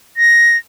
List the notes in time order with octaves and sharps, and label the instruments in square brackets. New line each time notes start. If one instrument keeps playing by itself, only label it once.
[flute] A#6